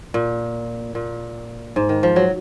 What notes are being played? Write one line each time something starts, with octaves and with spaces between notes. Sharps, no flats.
A#2
A#2
G#2
D#3
F3
F#3